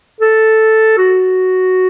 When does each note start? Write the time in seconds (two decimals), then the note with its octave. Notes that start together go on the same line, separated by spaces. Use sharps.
0.21 A4
0.98 F#4